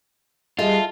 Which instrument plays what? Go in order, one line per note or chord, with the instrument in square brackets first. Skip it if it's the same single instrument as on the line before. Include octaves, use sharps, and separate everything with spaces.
[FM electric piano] G3 G#4 D#5 [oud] D#4 A4 E5 [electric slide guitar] F4